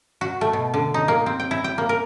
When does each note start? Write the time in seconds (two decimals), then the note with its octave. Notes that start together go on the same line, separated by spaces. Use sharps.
0.21 F#4
0.41 A3
0.53 B2
0.74 D3
0.94 D#4
1.08 A#3
1.26 C4
1.40 G5
1.51 E4
1.64 G5
1.78 A#3
1.89 A#4